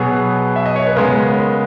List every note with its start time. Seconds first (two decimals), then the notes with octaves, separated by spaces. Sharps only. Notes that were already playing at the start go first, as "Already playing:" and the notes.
Already playing: B2 F#3 B3 G#4
0.56 E5
0.66 D#5
0.76 C#5
0.87 B4
0.96 C#3 G#3 B3 A#4